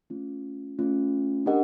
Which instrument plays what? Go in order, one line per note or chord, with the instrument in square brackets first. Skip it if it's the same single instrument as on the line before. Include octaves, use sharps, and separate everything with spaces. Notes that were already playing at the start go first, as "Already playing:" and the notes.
[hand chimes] A3 C#4 F4
A3 C#4 F4
D4 G4 A#4 D#5 F#5